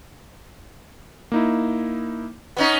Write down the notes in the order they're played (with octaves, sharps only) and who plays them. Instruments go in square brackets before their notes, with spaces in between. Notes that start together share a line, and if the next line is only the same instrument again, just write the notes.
[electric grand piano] A#3 D#4 E4
[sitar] B3 C#4 D#4